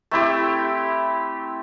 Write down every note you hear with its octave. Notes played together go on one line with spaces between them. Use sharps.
A3 C4 E4 G4